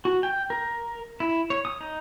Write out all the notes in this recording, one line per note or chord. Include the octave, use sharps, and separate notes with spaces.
F#4
G5
A#4
E4
C#5
D#6
D#4